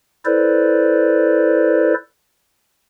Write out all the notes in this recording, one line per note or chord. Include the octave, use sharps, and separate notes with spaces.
E4 A4 B4 C5 D5